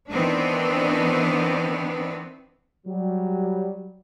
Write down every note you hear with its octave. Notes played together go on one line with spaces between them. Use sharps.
D#3 E3 B3 C4 D4
F#3 G3